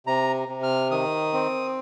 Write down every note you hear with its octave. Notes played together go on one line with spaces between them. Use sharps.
C3 A#5
C3
F6
D#3 D#6
C4